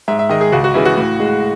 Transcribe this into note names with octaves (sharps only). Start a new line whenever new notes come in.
G#2 E5
E5
D#3 G#3 D#5
G#4
C#2 F#4
F#4
C#3 E3 G#3 E4
F#4
A2
G#3